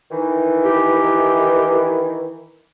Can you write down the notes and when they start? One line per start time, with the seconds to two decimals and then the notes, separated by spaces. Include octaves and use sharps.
0.11 D#3 E3
0.64 G4